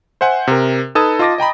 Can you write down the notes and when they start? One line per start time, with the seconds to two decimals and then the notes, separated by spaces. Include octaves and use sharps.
0.21 C5 E5 F#5 G#5
0.47 C3 A#4
0.95 D#4 A4 B4 A5 D#6 G#6
1.19 F4 D#5 A5 D6 A6 A#6
1.38 D#5 G5 A#5 B5